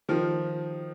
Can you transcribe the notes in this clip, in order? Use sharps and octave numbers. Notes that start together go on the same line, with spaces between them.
D#3 F3